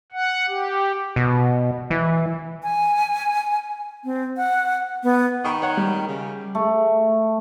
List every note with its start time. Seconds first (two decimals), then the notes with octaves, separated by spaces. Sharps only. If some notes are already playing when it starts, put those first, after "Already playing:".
0.12 F#5
0.48 G4
1.16 B2
1.90 E3
2.63 G#5
4.04 C4
4.37 F#5
5.04 B3
5.45 D#3 B5 C#6 D#6
5.62 C#5 F#5
5.77 G3
6.08 C#3
6.55 A3